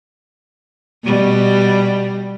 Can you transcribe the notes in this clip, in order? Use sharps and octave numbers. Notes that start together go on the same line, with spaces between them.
B2 G3